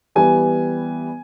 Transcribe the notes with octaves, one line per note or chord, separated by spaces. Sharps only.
E3 G3 B3 G#5